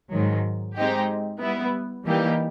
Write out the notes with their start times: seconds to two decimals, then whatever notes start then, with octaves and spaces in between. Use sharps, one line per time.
0.11 G#2 D#3 F#3
0.76 G#3 C4 D#4 G4
1.40 G3 B3 E4
2.05 E3 G3 A#3 D#4 G4